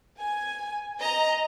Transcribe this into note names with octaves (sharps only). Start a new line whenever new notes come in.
G#5
D#5 A#5